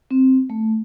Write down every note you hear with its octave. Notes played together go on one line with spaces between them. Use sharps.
C4
A3